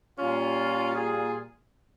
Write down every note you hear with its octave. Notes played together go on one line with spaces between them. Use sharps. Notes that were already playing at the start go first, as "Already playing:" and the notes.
A#2 G3 C#4 F4
F4 G#4